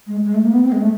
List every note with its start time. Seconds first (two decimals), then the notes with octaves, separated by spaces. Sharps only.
0.07 G#3
0.25 G#3
0.35 A3
0.44 A#3
0.53 B3
0.63 C4
0.72 G#3
0.82 A3